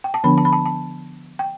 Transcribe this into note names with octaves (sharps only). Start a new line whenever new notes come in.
G5
A5
D3 F3 B3 D4 B5
A5
B5
A5
A5
G5